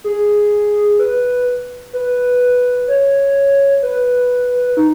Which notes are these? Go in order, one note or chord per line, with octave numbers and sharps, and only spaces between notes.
G#4
B4
B4
C#5
B4
D#4